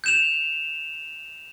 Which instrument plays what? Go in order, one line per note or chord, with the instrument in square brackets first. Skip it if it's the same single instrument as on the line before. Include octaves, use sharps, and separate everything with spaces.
[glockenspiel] G6 E7 F7